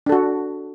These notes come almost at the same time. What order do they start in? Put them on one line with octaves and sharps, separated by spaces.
D4 A4 F#4